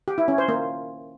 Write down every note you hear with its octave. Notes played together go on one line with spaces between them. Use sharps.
G4
E4
C#4
C5
A#3